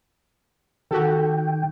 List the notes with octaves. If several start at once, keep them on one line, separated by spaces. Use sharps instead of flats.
D#3 F#4 G4 A4 G5